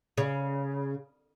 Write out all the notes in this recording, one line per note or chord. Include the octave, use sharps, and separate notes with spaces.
C#3